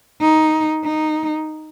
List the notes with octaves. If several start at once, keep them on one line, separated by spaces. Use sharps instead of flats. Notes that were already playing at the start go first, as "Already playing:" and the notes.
D#4
D#4